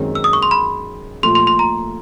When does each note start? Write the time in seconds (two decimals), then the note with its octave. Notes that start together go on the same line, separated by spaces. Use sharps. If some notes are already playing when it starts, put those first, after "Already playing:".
Already playing: F#2 D#3 G#3 C4
0.15 E6
0.24 D#6
0.33 C#6
0.42 C6
0.51 B5
1.23 A#2 F3 A3 C6
1.35 C6
1.47 C6
1.59 A#5